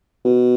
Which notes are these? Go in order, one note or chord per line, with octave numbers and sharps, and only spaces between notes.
B2